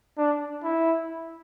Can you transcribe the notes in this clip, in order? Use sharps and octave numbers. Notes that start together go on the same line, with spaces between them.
D4
E4